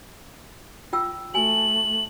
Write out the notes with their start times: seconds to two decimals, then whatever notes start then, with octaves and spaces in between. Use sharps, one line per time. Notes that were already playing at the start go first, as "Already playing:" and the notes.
0.93 F4 G5 E6
1.34 A3 F#4 G#5 F#7